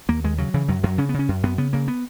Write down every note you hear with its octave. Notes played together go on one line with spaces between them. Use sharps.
D#2 A#3
D#2 G#3
C#3 F#3
C#3 E3
F#2 F#3
F#2 F#3
C#3 C#4
B3
C#3 C#4
F#2
F#2 B3
C#3 B3
C#3 A#3
B3